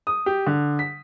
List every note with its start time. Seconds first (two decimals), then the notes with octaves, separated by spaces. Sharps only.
0.07 D#6
0.26 G4
0.47 D3
0.79 B6